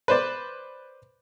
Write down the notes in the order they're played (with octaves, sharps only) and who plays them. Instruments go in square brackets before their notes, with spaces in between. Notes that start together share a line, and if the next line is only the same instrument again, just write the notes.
[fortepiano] B4 C5 D5